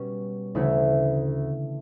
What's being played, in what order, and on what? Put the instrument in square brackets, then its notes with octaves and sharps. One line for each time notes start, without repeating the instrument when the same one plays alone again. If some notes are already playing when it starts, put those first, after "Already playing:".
Already playing: [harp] B2 G3 C#4
D2 C#3 E3 A3 E4